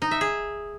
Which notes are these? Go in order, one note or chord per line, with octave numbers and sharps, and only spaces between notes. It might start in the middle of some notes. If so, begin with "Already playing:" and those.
D#4
E5
G#4